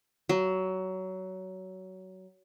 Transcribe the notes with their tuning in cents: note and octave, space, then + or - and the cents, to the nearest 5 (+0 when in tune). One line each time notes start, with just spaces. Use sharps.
F#3 +20